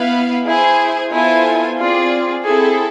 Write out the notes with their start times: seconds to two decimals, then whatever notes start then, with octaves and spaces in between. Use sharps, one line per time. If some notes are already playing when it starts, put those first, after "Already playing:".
Already playing: B3 E4 B4 F5
0.46 E4 G#4 C5 G#5
1.12 B3 E4 F4 A4 C5 G#5
1.78 C4 F4 G#4 D5
2.43 C4 E4 G#4 A4